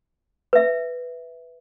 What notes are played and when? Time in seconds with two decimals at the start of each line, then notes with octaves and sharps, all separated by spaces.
0.53 B4 E5